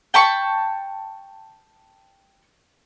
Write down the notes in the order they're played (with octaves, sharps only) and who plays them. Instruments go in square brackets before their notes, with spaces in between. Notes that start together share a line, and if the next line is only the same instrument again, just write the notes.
[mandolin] G5 A5 B5 C#6